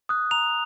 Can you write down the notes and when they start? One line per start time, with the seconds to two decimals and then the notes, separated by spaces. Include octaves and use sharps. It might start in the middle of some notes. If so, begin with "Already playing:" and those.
0.09 D#6 F#6
0.31 A#5 F7